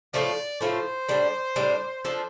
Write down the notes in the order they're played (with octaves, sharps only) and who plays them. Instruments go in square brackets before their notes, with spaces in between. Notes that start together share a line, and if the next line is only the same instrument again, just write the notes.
[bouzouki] A2 F3 A3 F4 [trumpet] D5
[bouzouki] A2 F3 A3 F4 [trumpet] C5
[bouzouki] A2 G3 D4
A2 G3 D4
F3 D4 A4